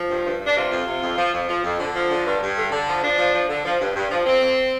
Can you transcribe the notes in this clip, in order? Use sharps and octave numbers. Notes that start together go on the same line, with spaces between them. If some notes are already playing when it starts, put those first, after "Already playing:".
Already playing: F3
G2
G2
G2
D4
C3 F4
F2
C3
F2
F3
F2
F3
F2
D3
F3
D3
G2
G2
D3
D3
F3
F3 D4
F3
F3
D3
F3
G2
G2
F3
F2 C4
F2